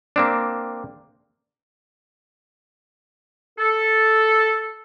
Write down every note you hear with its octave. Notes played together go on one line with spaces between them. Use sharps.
A#3 C4 D4
A4